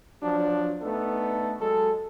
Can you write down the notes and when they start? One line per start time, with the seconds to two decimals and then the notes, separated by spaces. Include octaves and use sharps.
0.23 F3 F#3 D4
0.82 A3 B3 D4 D#4 A4
1.60 F#3 G#3 A4